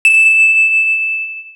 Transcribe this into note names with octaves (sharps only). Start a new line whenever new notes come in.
E7